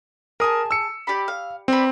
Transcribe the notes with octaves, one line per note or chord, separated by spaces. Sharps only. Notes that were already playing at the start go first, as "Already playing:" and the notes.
G#4 A#4 A5 D#6
E6 C#7
G4 D5 B5
F5
C4 B4 D5